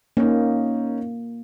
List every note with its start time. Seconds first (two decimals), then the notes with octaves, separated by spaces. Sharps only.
0.17 A#3 C#4 D#4